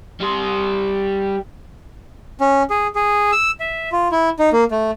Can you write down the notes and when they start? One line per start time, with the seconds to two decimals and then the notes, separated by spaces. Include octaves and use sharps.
0.20 G3 C6
2.40 C#4
2.70 G#4
2.95 G#4
3.32 E6
3.60 E5
3.92 F4
4.12 E4
4.39 D#4
4.53 A#3
4.71 A3